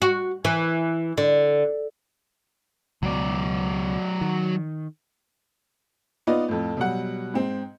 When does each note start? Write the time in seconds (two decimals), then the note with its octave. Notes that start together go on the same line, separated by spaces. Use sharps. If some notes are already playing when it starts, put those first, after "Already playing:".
0.02 F#4
0.45 E3
1.17 D3
3.03 C#2 B2 F#3 D5
4.21 D#3
6.27 B3 D#4 F4 B4 D5 D#5
6.48 F2 A2
6.77 B2 F#3 G3 F#5
7.34 G#2 C4